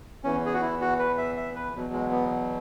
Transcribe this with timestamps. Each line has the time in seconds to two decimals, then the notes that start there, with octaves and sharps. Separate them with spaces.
0.24 E2 E3 C#4
0.46 G#4
0.54 F#4
0.62 E4
0.81 F#4
0.99 B4
1.18 E5
1.37 E5
1.55 B4
1.74 E2 B2 F#3
1.93 G#3
2.11 B3